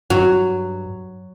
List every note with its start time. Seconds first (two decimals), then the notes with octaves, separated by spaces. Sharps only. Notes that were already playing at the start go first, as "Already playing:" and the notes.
0.10 G2 F#3